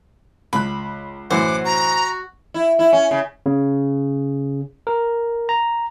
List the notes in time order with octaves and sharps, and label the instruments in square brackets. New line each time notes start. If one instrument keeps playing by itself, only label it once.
[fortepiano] C#2 F#6 [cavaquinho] B5
[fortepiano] F#2 A2 E3 [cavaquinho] C5 [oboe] F#5 [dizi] D6
[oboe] F#4 [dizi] A#5
[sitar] E4
E4
C#4
C#3
[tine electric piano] C#3
A#4
A#5